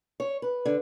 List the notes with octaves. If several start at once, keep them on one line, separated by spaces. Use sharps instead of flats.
C#5
B4
D3